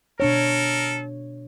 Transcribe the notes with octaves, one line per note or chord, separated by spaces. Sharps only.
B2 D4 A4 A#4 C#5